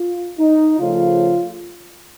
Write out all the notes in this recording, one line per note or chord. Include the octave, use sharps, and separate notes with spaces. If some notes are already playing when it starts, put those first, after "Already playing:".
Already playing: F4
D#4
C#3 F3 A3 F4